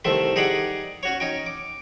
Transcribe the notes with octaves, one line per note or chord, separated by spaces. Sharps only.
C2 D#3 A3 C4 E5
D#4 G4 G#4 D5 F#5 G5
C#4 F#4 C#5
C#4 D#4 G5
D6